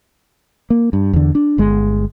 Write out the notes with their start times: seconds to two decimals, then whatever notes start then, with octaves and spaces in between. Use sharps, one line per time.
0.70 A#3
0.93 G2
1.13 E2 D3
1.35 D4
1.58 G1 G#3